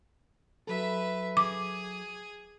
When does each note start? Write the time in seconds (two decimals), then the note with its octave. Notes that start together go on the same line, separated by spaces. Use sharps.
0.67 F#3 A4 B4 E5
1.37 G#4 D6